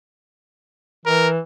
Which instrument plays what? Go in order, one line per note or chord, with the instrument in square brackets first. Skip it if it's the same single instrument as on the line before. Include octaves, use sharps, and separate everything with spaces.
[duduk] E3 [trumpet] A#4